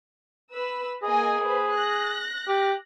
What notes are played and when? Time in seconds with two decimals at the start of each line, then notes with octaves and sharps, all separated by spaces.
0.53 B4 E6
1.02 A#3 G#4 D#5 G#5
1.45 B4 C5
1.76 F#6 A#6
2.48 G4